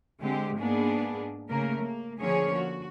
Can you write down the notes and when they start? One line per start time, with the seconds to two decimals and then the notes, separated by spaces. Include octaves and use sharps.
0.21 D3 G#3 C4 G4
0.57 G#2 A#3 B3 D4 G#4
1.50 C#3 A3 A#3 A#4
1.83 A#3
2.21 D3 F3 A#3 C#4 G#4 C#5
2.55 F#4